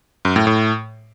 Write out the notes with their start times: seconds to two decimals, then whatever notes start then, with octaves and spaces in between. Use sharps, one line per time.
0.25 F#2
0.36 A2
0.47 A2